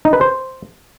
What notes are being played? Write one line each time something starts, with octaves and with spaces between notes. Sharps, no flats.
D#4
B4
C5